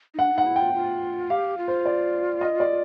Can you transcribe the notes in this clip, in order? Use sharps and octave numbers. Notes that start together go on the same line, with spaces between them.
D#4
D4 F#5
D#4 F#5
E4
F4 G5
F4
G4 F5
F4
C5
D5
D#5
D5